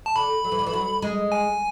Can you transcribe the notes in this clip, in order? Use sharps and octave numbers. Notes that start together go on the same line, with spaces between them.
A5
D3 B5
F#3
E3
D3
E3
F#3
G#3
G#5